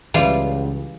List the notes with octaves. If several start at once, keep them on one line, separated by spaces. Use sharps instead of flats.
C#2 E3 G3 F4